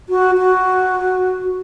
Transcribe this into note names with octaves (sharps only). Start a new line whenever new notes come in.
F#4
F#4